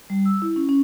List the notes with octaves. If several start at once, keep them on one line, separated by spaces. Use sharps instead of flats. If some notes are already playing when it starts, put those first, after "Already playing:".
G3
E6
E4
C#4
C#4